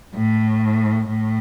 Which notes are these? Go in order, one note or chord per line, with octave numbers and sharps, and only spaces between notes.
A2
A2